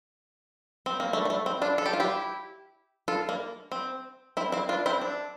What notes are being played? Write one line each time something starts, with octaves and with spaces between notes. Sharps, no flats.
C4
A#3
A3
G3
A3
C4
D4 F4
A4
G4
F4
E4 G4
F4 A4
A#3
C4
C4 E4
C4 E4
D4 F4
C4 E4
D4